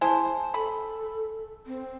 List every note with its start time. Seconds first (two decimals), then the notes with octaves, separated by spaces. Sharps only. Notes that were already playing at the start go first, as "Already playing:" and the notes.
0.01 G#3 E4 C5 G#5 A5
0.54 A4 B5
1.66 C4